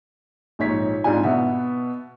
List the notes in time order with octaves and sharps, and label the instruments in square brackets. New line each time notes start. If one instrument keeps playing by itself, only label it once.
[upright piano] A#1 G#2 C#5 B6
G#2 C4 D4 F4 G#5
B2 B3 E5